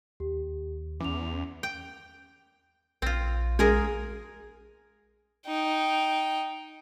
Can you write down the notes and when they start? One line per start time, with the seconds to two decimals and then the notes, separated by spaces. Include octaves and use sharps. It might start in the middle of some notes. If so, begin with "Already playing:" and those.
0.20 D#2 G4
1.00 E2 C#4 D6 F7
1.63 G5
3.02 A#1 C4 F4
3.59 G#3 G#4 A#4 G#5
5.46 D#4 G5